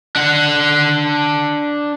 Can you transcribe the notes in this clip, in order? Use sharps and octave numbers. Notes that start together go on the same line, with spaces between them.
D4 F#5